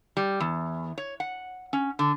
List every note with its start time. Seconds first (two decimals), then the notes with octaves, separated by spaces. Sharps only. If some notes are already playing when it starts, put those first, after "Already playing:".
0.17 G3
0.40 E2
0.98 C#5
1.20 F#5
1.73 C#4
1.99 D3